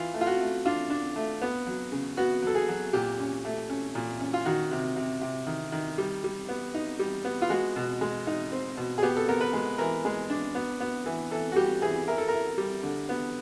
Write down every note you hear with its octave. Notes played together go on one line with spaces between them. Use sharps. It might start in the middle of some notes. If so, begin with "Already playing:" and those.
Already playing: E3 F4
A3
F4
F#4
A3
D4 F4
D4
A3
B3
F#3
C#3
B3 F#4
F#3 A4
G#4
F#3
A#2 G4
C#4
A3
C#4
A#2
C#4
F4
D#3 F#4
C3
C3
C3
D#3
D#3
G3
G3
B3
D#4
G3
B3
F4
G#3 F#4
B2
G#3
D#4
C4
B2
G#4
B3 G4
A4
B3 A#4
B4
G#3
E3 A#4
G#3
D4
B3
B3
E3
E3 A4
F#4
G3 G4
E3 G#4
E4 A#4
A4
E4 A#4
G3
D3
B3